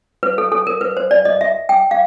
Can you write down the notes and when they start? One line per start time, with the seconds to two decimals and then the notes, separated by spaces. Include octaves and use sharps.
0.23 B4
0.38 A4
0.52 A4
0.67 A#4
0.81 B4
0.97 C5
1.11 D5
1.25 D#5
1.41 E5
1.69 G5
1.91 F5